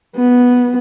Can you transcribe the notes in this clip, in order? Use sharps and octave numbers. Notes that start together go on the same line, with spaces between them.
B3